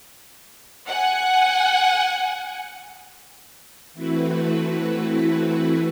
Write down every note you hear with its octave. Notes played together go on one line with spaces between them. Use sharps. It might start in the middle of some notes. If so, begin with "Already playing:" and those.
F#5 G#5
E3 A3 C4 E4 F#4 B4